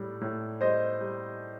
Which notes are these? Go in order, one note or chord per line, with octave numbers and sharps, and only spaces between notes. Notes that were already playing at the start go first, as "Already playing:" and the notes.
Already playing: A2 G3
A2
G3 C5 D#5
G3